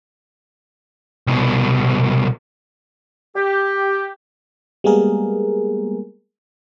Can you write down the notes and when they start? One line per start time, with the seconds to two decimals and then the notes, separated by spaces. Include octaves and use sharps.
1.27 C2 B2
3.36 G4
4.84 G3 G#3 A#3 B3 G#4 A#4